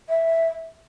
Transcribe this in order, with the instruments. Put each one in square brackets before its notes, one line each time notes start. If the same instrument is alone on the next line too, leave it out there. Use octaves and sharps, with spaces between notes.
[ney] E5